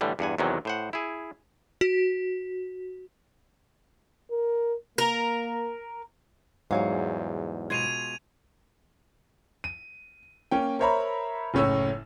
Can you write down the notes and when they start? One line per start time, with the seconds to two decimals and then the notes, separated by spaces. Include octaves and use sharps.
0.01 A2 D3 E3 G3
0.19 E2 G2 F#5 G#5
0.38 E2 C3 D#3 E3 F#3
0.65 A2 C5 F#5
0.93 E4 G#4
1.81 F#4
4.31 A#4
4.98 A#3 A#4
6.71 E2 G#2 F#3 G3 C#5 F5
7.70 B2 G#3 F4 G#6 D#7 F7
9.64 D#7
10.51 A#3 C#4 G5
10.79 A#4 C5 C#5 E5 A#5 B5
11.54 F#1 A2 C#4 C#5 E6